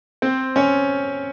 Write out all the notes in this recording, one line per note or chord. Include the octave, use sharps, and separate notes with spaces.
C4 C5
C#4 C#5